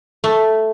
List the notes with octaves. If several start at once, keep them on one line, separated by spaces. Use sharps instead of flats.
A3